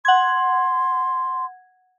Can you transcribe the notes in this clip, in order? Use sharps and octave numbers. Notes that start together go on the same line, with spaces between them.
F#5 C6 G#6